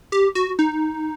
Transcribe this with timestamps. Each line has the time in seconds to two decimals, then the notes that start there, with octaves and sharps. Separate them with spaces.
0.12 G4
0.35 F#4
0.59 D#4